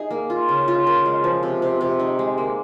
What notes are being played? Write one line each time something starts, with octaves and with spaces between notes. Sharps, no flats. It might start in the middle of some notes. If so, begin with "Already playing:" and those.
Already playing: D#4 G#4
A#3
F4
C#3
F4
A#4
G#3
F3
C3
C3
C3
D#4
G#3
A#3